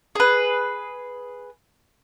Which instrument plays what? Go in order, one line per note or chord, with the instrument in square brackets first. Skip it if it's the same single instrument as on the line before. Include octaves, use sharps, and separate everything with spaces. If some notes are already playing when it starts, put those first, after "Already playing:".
[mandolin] G#4 B4